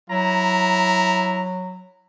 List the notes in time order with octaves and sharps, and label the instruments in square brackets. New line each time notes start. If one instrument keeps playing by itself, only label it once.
[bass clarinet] F#3 [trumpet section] E4 A#5